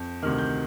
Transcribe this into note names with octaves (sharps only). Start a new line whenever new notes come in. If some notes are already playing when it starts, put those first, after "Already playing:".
Already playing: F2 G6
D2 C3 D#3 F6
G6